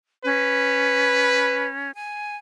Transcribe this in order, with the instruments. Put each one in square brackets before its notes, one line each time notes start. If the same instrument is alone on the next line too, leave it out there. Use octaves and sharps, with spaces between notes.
[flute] C#4 [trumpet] B4
[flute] G#5